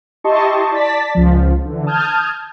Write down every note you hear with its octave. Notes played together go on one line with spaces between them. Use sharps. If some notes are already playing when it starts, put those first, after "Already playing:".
E4 G4 D#5 A5 C6 C#6
D5 A5 A6 B6
C#2 F3
D3 E3
A5 D#6 F6 G6 G#6